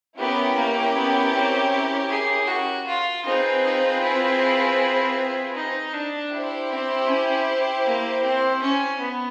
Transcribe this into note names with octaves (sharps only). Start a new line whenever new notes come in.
B3 C#4 E4 G4 A#4 C#5
A#3
B3
C4
G#4
F#4
F4
C4 D#4 F4 G#4 B4
D#4
E4
D#4
D4
E4 G4 C5
C4
C#4
A#3
C4
C#4
B3